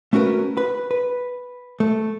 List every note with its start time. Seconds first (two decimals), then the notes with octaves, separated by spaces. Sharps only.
0.13 A3 C#4 F#4 A#4 B4
0.57 B4
0.91 B4
1.80 A3